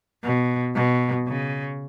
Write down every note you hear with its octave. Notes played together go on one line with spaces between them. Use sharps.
B2
B2
C#3